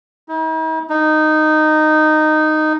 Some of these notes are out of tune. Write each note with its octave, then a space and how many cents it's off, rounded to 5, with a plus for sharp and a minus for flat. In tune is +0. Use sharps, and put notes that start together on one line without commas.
D#4 +45
D#4 -10